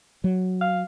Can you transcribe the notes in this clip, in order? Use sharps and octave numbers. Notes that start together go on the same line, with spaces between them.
F#3
F5